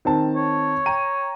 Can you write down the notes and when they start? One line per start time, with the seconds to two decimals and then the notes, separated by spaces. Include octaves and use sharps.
0.05 D#3 C4 A5
0.36 C#5
0.86 G5 A#5 D#7